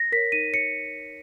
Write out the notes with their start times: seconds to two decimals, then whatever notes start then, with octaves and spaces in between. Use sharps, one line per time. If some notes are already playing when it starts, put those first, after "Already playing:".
Already playing: A#6
0.12 A#4 C#5 B6
0.32 D#4 D#7
0.53 A#4 C#5 C#7